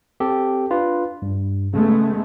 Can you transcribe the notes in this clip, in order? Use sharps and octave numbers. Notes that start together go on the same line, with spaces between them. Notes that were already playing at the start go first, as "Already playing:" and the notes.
C4 G4 A4
D4 F4 B4
G2
C#3 G#3 A3 B3